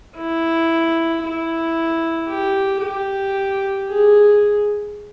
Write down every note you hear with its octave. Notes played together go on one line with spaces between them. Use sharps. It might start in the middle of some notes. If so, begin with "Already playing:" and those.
E4
E4
G4
G4
G#4